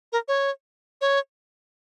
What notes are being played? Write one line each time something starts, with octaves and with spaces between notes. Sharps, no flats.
A#4
C#5
C#5